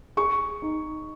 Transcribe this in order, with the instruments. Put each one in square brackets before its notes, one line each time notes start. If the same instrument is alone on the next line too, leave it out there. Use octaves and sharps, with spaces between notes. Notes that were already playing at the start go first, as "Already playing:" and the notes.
[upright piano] G#4 [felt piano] C#6
[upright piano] D#4